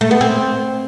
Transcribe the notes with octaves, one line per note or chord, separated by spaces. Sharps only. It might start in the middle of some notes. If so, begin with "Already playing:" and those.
A3
B3
C4